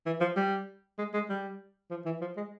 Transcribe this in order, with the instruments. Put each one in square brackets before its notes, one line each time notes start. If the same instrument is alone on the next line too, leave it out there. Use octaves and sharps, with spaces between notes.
[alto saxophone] E3
F3
G3
G#3
G#3
G3
F3
E3
F3
G#3